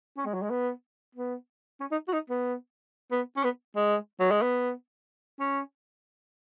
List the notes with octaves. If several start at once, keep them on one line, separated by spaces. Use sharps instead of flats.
C#4
G#3
F#3
G#3
B3
B3
C#4
D#4
F#4
D#4
B3
B3
C#4
B3
G#3
F#3
G#3
B3
C#4